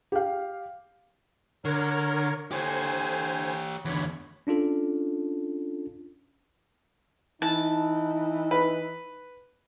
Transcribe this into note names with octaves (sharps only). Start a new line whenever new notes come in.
G4 F5
D3 A#4 C#5
D3 G4 C5 C#5 G#5
E2 D3 C#5 B5
C#4 D4 F4 A4
E3 D#4 A5
B4